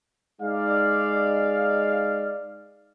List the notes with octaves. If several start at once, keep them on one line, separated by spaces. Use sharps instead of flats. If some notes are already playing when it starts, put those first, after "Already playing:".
G#3 D#4 D5 F5